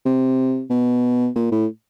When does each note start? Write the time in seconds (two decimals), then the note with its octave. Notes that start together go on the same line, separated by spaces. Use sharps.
0.05 C3
0.70 B2
1.35 A#2
1.52 A2